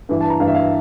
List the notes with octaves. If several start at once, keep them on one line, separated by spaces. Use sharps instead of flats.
G2 E3
A5
A#5
G2 E3 F5
E5
F5